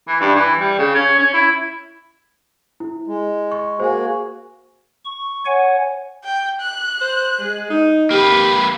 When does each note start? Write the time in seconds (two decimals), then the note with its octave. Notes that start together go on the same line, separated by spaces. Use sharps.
0.08 E3
0.21 G2
0.36 E3
0.60 G3
0.78 C#3
0.95 C#4
1.19 C#4
1.34 E4
2.80 E4
3.07 G#3
3.52 C#6
3.80 A#3 F#4 G#4 C5 F5 G#5
5.05 C#6
5.46 C#5 F#5 G#5
6.24 G5
6.60 F#6
7.01 C5
7.39 G#3
7.70 D#4
8.11 A#3 G4 B4 B5